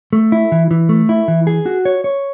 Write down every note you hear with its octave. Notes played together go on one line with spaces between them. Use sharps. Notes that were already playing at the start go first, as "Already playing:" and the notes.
A3
E4
E3
E3
A3
E4
E3
G#4
F#4
C#5
C#5